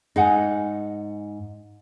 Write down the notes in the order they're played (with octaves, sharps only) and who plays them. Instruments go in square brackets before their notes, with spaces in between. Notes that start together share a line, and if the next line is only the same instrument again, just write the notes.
[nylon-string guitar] G#2 D#4 [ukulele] G#4 F#5 G#5